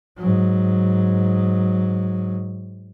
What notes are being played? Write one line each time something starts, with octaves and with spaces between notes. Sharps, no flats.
G#2 F#3